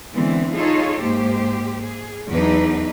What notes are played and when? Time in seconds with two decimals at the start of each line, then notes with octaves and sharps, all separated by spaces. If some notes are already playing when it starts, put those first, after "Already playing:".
0.15 D3 E3 G#3 B3 C4
0.54 D#4 F4 G#4 A4 C#5
1.02 G#2 A#3 G4 C5
1.83 G#4
2.30 E2 E3 F#3 D4 D#4 B4